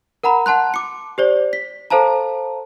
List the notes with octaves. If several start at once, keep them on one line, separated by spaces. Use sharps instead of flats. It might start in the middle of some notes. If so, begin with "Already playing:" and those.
A#4 F#5 A#5 B5
F#5 A5 C6 F#6
D6 C#7
G4 C5 D5
B6
A4 C5 F5 A5 A#5